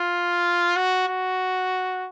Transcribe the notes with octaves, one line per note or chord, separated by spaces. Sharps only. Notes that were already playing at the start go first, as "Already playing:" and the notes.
Already playing: F4
F#4
F#4